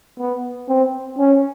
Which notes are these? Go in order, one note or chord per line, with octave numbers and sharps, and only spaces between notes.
B3
C4
C#4